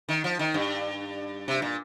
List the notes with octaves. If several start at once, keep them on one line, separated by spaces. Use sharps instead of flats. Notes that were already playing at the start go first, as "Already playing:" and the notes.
D#3
F3
D#3
G2
C3
A#2